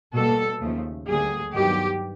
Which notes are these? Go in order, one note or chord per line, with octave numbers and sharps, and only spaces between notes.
B2 G3 A#3 A4
D#2 C#3 F3 A3
D2 D3 G3 A#3 G#4
G2 D#3 F#3 B3 G4